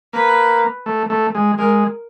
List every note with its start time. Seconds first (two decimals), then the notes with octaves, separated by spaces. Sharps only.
0.13 A#3 B4
0.86 A3
1.10 A3
1.35 G#3
1.58 G#3 A#4